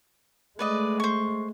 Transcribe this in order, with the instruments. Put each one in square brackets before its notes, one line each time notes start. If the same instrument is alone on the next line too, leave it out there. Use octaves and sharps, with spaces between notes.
[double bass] G#3 A3 [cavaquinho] B4 D5 D#5
[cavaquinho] C5 C#6